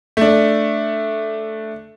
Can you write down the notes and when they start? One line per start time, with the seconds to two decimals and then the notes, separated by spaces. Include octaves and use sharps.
0.17 A3 D4